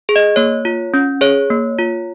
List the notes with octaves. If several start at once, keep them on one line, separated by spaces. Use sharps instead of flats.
G#4
D#5
A#3 C#5
F4
C#4
G#4 C#5
A#3
F4